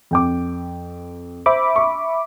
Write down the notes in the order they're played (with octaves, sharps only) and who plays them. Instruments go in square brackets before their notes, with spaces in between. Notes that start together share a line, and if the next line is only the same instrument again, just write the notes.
[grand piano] F2 G5 D6
[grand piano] C5 [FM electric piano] E5 B5 D6
[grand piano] C#6